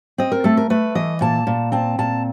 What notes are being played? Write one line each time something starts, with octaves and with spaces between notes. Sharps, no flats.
C4 D#5
A#4
A3 A4
A#4
A3 B4
E3 D#5
A#2 A5
A#2
C4 A5
A#2 A5